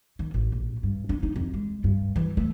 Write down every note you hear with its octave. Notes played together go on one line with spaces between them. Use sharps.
D#3
A1
A#1
G2
D4
D#4
F2
G#3
G2
E3
A3